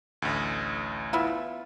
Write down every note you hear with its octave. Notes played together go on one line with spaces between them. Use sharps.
A1 D2
B3 E4 F4